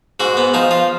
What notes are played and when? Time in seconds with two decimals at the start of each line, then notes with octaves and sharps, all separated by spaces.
0.20 G#2 F#4
0.37 B3
0.54 F3 D#4
0.71 F4